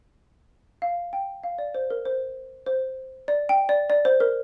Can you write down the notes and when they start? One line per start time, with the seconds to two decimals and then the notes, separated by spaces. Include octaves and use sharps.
0.82 F5
1.13 G5
1.44 F5
1.58 D5
1.75 C5
1.90 A#4
2.06 C5
2.66 C5
3.28 D5
3.49 G5
3.69 D5
3.90 D5
4.05 C5
4.20 A#4